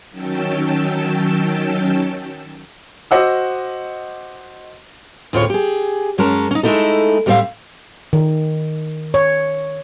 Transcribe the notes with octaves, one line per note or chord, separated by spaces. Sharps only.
D#3 F#3 C#4 G5 A5 E6
F#4 C5 D#5 F#5 D6 E6
D2 A2 C4 F4 G#4 C#5
G4 G#4
F#2 G#3 C#4 A#4 A5
C#4 D#4
G#3 A3 C#4 D#4 E4 A4
A2 G3 C4 C#5 E5 F5
D#3
C#5